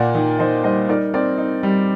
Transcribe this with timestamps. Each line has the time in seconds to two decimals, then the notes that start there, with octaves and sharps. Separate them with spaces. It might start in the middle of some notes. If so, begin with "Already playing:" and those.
Already playing: A#2 A#3 D5 F#5
0.15 D#3
0.39 D#3 C5 D#5
0.63 G3 C5 D#5
0.89 D#4 A#4 D5
1.14 C4 A#4 D5
1.38 D#4
1.63 G3